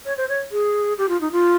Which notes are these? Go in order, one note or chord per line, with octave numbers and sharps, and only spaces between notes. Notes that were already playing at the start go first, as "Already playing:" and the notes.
C#5
C5
C#5
G#4
G4
F4
D#4
F4